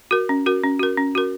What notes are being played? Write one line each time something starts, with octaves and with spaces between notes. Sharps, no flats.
F#4 A#4
C#4
F#4 A#4
C#4
F#4 A#4
C#4
F#4 A#4